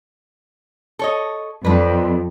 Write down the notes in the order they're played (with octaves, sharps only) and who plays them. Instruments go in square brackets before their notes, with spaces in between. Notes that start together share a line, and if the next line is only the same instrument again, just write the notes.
[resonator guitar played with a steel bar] A4 C#5 D#5
[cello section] F2 [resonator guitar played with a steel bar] D4 B4